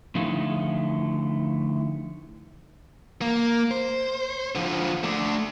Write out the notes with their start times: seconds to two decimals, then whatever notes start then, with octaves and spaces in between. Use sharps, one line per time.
0.15 D3 F3 A3 D#4 E4
3.22 A#3
3.71 C5
4.55 D3 F3
5.04 A3 D4